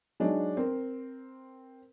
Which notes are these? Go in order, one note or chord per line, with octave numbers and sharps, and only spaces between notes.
F#3 G#3 D4 D#4
C4 A#4